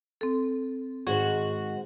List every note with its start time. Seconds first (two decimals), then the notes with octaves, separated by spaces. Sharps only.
0.21 C4 A4
1.07 G#2 D#3 F#4 G#4 C5